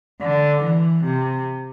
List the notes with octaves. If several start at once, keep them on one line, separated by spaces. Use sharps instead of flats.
D3
E3
C3